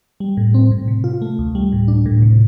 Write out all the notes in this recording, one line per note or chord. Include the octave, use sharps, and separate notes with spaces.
G3
A2
C4
A2
C3
F4
A3
D2
G3
A2
D4
A2
C3